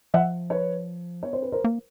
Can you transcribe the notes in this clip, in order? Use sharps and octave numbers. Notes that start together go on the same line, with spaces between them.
F3 E5 F#5
B4 C#5
B3 C#5
C4 C5
B4
A#4 C5
A#3